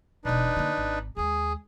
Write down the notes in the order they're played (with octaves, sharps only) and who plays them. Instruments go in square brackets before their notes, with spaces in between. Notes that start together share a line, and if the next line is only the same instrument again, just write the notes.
[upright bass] E1 B2 [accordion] D4 D#4 B4
[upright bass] D3 A#3
G#1
[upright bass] D#2 G#3 [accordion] G#4